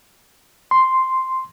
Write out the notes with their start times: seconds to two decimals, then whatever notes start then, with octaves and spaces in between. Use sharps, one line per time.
0.71 C6